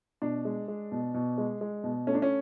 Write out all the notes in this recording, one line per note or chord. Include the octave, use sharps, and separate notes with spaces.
B2 D4
G#3
G#3
B2
B2
G#3
G#3
B2
A3 C#4
D4
C#4